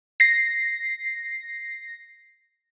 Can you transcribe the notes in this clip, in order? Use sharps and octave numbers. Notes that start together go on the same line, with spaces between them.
A#6 C7